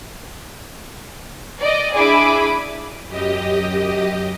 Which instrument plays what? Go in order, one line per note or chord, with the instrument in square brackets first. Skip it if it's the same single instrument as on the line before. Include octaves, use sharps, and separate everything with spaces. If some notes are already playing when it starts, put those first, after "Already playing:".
[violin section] D5 D#5
D4 E4 G#4 G#5 B5 D6
[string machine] F#2 G4 D#5